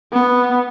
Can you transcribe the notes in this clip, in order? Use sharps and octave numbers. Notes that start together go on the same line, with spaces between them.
B3